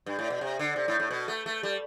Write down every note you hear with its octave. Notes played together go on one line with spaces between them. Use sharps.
G2
A2
B2
C3
D3
C3
A2
A2
B2
A3
A3
G3